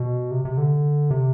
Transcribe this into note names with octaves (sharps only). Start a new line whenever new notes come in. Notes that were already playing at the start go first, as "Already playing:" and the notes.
Already playing: B2
C3
C3
D3
C3